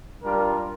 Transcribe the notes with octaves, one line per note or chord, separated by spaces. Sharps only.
G3 D4 F4 A#4